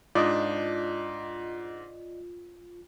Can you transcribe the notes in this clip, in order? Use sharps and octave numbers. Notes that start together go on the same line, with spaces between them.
G#2 D4 F4 D5 D#5